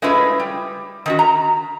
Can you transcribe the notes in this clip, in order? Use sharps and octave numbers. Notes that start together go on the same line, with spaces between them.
G#3 A3 C#4 E4 F4 B4
G3
D#3 C#4 F#4
A#5